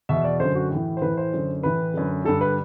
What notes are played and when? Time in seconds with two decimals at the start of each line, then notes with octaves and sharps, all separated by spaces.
0.09 E2 B2 E5
0.24 D5
0.40 F#2 D3 C5
0.55 F#4
0.71 A2 E3
0.97 C5
1.02 A2 E3 B4
1.17 C5
1.33 F#2 D3
1.63 A2 E3 B4
1.94 F#2 D3
2.25 G2 D3 A4
2.41 B4